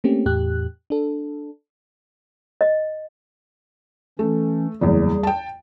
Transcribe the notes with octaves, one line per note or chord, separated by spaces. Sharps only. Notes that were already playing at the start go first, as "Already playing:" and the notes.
A3 A#3 C4 C#4 G4
E2 A2 G4 F#6
D4 A4
D#5
E3 A3 C#4
F#1 E2 G3 G#4
G5 A5